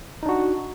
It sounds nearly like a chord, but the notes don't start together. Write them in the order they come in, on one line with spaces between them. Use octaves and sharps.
D#4 D4 F#4